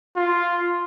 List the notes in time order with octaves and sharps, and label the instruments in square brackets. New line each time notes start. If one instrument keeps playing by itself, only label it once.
[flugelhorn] F4